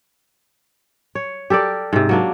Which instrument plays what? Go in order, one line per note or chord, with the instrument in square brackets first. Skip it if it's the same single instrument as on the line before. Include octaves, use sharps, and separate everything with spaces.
[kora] C#5
G4 A4 A#4 D5
G#2 C3
F#3 A#3 D4